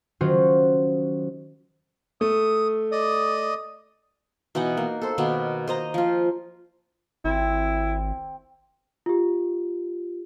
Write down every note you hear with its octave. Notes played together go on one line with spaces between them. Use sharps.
D#3 F#3 C#4 F4 F#4 C5
A3 D#6
D5 D#5 D#6
B2 E3 D#4 F#5
A#3
A4 C5
B2 D#3 A#3 B3
C5 D#5 A#5
F3 F4
G#1 C4 E4
F4 G4